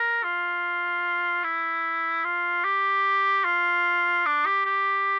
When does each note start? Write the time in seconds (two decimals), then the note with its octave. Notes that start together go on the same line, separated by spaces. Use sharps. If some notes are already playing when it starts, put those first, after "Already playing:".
Already playing: A#4
0.24 F4
1.44 E4
2.24 F4
2.65 G4
3.45 F4
4.26 D4
4.46 G4
4.65 G4